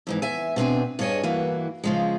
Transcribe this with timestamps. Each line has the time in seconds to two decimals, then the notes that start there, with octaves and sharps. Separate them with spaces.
0.07 F2 G#2 E3
0.22 E2 E5 G#5
0.56 B2 C4 D4 G#5
0.99 G2 D4 G#4 C#5 D#5 G#5
1.23 G2 E3 A#3 F#4
1.84 C#3 F3 G#3